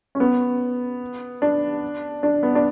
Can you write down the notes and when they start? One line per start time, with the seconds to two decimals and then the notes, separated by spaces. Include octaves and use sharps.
0.15 C#4
0.20 B3
1.42 D4
2.23 D4
2.43 B3
2.55 D4